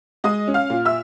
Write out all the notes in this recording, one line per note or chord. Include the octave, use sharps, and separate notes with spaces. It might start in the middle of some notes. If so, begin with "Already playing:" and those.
G#3 D#5 D#6
C#4
F5 F6
A#2
E5 E6